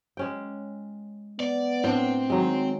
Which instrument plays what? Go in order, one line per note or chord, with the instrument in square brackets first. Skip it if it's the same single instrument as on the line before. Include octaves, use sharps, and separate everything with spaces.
[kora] G#3 C#4 G5
[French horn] B3 [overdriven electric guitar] D5
[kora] A2 D4 [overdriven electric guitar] C4
[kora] D#3 F#3 G#3